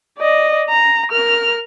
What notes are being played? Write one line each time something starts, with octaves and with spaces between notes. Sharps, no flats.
D5 D#5
A#5
A#4 F6